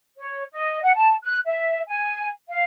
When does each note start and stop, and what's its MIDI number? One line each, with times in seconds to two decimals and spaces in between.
0.18 0.42 73
0.52 0.78 75
0.81 0.91 78
0.94 1.12 81
1.23 1.37 90
1.45 1.80 76
1.86 2.27 80
2.48 2.63 77